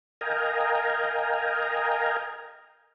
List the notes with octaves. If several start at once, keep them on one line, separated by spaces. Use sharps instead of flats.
A#4 D#5 F5 G5 G#5 A#5